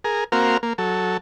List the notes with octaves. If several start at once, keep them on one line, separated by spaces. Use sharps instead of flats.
G#4 A#4
A#3 C4 F#4 A#4 F5
A#3
F#3 A4